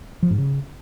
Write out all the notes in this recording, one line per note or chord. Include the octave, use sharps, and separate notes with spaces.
F3
G#2
C#3